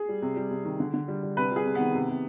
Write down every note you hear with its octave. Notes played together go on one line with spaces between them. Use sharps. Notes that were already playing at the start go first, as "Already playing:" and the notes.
Already playing: G#4
G3
C3
G3
C3
D#3
D3
D3
G3
G3
C3 B4
G3 G#4
C3
B3
D#3
C3
C3